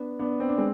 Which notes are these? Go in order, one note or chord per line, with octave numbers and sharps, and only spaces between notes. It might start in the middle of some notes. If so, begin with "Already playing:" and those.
Already playing: B3 D4
B3 D4
C4
D4
G#3 C4